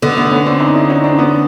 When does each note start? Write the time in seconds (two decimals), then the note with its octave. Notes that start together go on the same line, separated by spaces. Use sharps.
0.02 D3 A3 B3
0.17 A3 B3
0.31 B3 C#4
0.46 C4 D4
0.60 C#4 D#4
0.75 D4 E4
0.89 C#4 D#4
1.04 C4 D4
1.19 B3 C#4